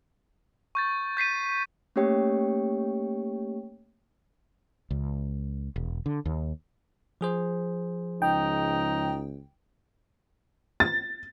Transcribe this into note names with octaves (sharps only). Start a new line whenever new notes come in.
C#6 G6 A6
G6 B6 C7 D#7
A3 A#3 C#4 G4 C#5 G5
C#2
E1
D3
D#2
F3 G#4 C5
C#2 D#4 G5
A6